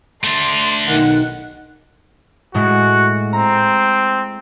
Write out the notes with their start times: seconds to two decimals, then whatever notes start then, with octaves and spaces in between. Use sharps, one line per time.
0.24 A3 D4 C6
0.88 B1 D#3 F#5
2.54 A2 G#3 A3 F#4
3.33 C4 A#5